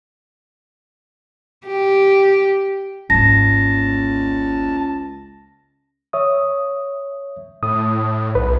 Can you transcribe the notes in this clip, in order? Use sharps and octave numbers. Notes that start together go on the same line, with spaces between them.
G4
G#1 C#2 A#3 A5 A#6
C#5 E5 D#6
A2 D#6
B1 B4